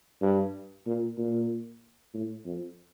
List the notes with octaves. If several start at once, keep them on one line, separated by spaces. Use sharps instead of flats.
G2
A#2
A#2
A2
F2